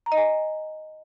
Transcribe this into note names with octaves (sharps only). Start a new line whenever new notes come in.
A#5
D#5
G#5